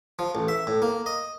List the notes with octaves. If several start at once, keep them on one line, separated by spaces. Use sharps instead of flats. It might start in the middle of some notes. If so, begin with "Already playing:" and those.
F3
A1
E5
A2
A#3
D#5